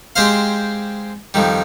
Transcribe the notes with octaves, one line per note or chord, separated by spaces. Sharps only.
G#3 C4 G4 C5 F5
F2 D#3 G3